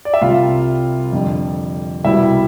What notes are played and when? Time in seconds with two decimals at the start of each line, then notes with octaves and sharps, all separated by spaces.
0.05 D5
0.14 E5
0.21 C2 C3 G3 F4 F5
1.13 F2 D3 G3
2.04 C2 B2 G3 E4 E5